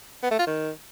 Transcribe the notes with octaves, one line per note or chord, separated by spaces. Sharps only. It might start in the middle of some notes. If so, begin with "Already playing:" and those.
B3
A3
F4
D#3